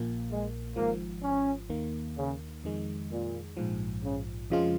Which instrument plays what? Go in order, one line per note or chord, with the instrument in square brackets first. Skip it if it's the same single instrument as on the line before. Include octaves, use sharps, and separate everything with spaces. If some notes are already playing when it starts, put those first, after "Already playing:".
Already playing: [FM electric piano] A#1 A#2 A#3
[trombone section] G#3
[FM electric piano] G#1 G#2 F3 [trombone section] A#3
[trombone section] C#4
[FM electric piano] D#2 D#3 A#3
[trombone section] C#3
[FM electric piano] F2 D#3 G#3
[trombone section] A#2
[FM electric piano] A#1 G#2 F3
[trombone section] C#3
[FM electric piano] F2 C#3 F3 G#3 F4